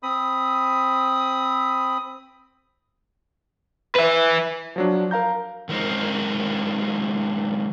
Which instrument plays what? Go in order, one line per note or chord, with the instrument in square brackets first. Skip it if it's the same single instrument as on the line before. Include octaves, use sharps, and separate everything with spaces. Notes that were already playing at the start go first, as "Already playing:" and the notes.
[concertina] C4 B5 D#6
[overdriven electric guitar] B4 E5
[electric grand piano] F3 F#3 D4
A#4 F5 A#5 G6
[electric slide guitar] D#3 F3 G#3 A#4 C5